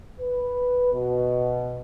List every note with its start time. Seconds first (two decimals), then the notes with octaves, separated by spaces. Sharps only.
0.20 B4
0.93 B2